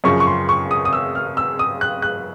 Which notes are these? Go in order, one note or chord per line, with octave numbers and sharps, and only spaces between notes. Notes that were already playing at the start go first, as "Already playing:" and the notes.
F#2 C#3 F3 C#6
C#6
C6
C#6
D#6
D#6
E6
F6
E6
D#6
F#6
F#6